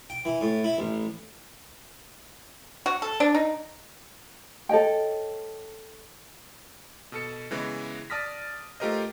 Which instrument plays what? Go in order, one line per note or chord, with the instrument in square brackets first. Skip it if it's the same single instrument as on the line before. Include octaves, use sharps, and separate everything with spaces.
[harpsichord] G5
E3
A2
E4
A1
[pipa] F#4
A4
D4
D#4
[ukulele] A4 C#5 D#5 G5
[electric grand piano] B2 A4 C#7
C#3 E3 G#3 B3
D5 A5 D#6 F6 A#6 B6
A3 F4 G4 A#4 C5 D#5